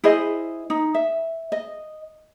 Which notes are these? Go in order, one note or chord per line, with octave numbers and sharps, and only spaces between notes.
E4 G#4 C5 D#5
D#4
E5
D#5